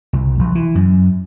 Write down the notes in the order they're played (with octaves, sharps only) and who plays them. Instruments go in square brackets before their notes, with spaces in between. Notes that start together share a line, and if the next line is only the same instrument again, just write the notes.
[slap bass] C2
A#1
E3
F#2